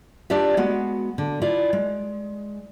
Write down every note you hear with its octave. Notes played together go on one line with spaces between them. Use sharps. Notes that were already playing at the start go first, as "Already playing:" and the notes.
D4 F4 G4 D5 E5
G#3 B3 F#4
D3
E4 F4 D5
G#3